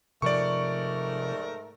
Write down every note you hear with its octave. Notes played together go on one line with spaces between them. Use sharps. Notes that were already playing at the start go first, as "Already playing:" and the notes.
G#2 C3 F3 A3 A#4 D5 C#6